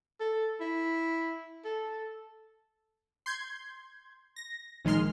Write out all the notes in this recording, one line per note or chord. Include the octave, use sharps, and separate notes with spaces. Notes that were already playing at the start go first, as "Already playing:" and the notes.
A4
E4
A4
C6 G6 G#6
A#6
A#1 D#3 G#3 C6 F6